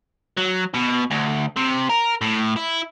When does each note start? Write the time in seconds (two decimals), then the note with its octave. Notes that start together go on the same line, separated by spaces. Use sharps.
0.37 F#3
0.74 B2
1.11 D2
1.56 C3
1.90 A#4
2.21 A2
2.56 E4